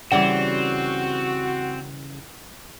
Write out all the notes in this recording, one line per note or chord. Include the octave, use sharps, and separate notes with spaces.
C#3 E3 G3 C4 C#4 F#4 D5 F#5